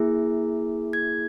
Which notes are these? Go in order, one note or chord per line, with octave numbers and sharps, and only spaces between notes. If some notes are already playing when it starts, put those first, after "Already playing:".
Already playing: A#3 E4 G#4
G#6